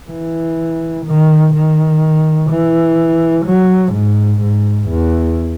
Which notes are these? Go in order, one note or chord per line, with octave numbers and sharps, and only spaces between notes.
E3
D#3
D#3
E3
F#3
G#2
G#2
E2